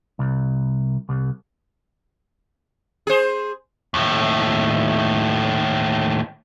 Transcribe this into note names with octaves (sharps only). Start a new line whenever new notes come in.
C2
C2
G#4 C5
D#2 A2